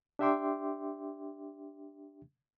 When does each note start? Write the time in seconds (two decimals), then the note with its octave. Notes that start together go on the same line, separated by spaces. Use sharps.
0.19 D4 G4 E5 G5 C6 D6